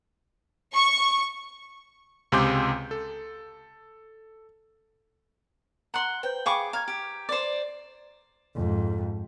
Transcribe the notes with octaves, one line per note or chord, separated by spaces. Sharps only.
C#6
C#2 C3 G#5 C6 D6 G6
A4
F#5 A#5 C6 F#6 F#7
B4 C5 G5 G6
G#4 F5 G5 B5 C#6 D6
F5 A#5 G#6
G4
C5 D5
F2 G#2